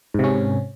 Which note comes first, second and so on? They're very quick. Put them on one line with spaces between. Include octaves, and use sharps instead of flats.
G#2 C3 C#4